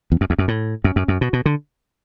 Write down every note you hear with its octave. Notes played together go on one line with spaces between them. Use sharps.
E2
F#2
E2
F#2
A2
F#2
F#2
F#2
B2
B2
D3